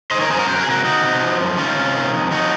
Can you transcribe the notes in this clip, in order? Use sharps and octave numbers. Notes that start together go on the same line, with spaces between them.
D#3 C5 D#5
A#4 C#5
F#2 G#4 C5
F#4 A#4
F#3 C5
A#4
G#4
C3 F#4 A#4
D#3 D#4 F#4
C3
F3
F#2
D#3 C#4 F4
C3
D#3
F2
F3 D#4 F#4